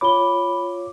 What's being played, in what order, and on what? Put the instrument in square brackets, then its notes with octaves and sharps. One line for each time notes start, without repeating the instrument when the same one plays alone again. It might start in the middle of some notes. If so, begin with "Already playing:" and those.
[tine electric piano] F4 C#5 D6 [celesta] B5 G7